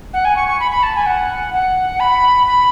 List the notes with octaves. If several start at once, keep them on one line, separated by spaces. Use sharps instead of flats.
F#5
G#5
C#6
C#6
B5
B5
A5
G#5
F#5
F#5
B5
B5